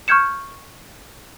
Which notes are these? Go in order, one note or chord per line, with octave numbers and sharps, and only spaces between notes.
C#6 F6 G6 G#6 C#7 E7